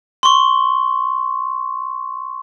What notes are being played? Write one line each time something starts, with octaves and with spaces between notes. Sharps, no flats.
C6 C#6